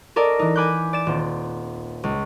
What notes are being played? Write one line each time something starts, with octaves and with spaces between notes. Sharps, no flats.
C#4 A4 A#4 D5 D#5
E3 D#4
G#5 B5 D6 F#6 G6
D5 A6 E7
D#1 C4
C#2